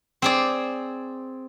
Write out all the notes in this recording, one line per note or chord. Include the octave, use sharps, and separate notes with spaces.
C4 G#4 D5